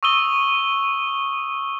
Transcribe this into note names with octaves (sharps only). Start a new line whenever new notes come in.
C#6 D#6 E6 D#7 G7